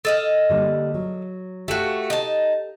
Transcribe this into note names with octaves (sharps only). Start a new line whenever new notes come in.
A4 D#5 F5
D3 G3 A#3
F#3
A3 F#4 G4 A4 F5
D#4 A5